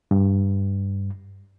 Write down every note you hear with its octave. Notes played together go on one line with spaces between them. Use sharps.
G2